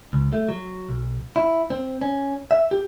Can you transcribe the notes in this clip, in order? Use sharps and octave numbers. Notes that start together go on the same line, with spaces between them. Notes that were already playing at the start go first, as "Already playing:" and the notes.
C#2
A3
F#3
B1
E4
C4
C#4
E5
G4